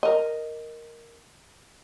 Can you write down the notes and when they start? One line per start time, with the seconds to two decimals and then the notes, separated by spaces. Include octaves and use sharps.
0.03 A#4 D#5